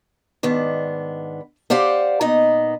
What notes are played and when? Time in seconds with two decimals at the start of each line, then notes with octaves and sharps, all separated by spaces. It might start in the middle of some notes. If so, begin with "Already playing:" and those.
0.43 G#2 D#3 B3 D4
1.70 G4 C5 D5 F5 F#5
2.21 A#2 B3 D#4 D#5